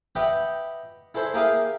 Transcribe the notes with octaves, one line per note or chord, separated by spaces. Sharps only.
G4 B4 D#5 E5 F#5 G5
E4 G#4 A4 C5 E5
A#3 G4 G#4 E5 F5 D#6